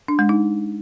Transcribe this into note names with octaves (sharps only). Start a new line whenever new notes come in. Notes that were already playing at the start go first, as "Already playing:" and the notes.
D4
G#3
D#4